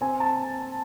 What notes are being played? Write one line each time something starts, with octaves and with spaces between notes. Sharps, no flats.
C4 G#5
A5